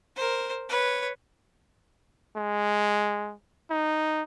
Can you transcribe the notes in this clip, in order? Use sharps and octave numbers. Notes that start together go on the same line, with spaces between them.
A#4 C5
B4 C#5
G#3
D#4